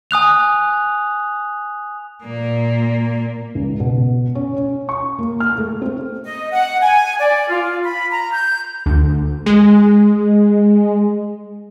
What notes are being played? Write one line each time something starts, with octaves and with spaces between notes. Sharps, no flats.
G#5 D#6 F#6 F7
A#2 A#3
C#2
B2
C#4
C#4
C#6
A#3
F6
A3
C4
D#5
F#5
G#5
D5
F4
B5
A#5
G6
D2
G#3